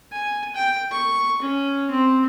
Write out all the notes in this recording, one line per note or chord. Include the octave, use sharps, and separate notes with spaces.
G#5
G5
C#6
C#4
C4